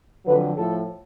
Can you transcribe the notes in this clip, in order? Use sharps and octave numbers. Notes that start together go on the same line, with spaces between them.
F2 D3 F#3 B4
A2 F3 A4